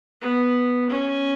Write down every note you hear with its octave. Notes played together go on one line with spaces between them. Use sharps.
B3
C#4